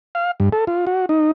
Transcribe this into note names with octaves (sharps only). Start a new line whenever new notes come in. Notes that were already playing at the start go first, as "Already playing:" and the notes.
F5
G2
A4
F4
F#4
D#4